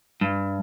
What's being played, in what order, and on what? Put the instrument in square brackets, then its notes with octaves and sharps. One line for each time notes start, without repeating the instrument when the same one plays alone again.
[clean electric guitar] G2